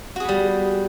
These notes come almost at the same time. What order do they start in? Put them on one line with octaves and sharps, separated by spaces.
F#4 G#4 B3 G3